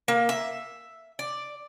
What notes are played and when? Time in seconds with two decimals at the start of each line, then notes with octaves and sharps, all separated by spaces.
0.08 A#3
0.29 E5
1.19 D5